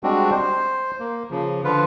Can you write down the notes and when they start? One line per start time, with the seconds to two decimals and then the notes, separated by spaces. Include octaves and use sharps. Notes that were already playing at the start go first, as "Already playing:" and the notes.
0.03 G3 G#3 C4 D4 F#4
0.31 C5
1.00 A#3
1.31 C#3 F3
1.64 D3 F3 F4 B4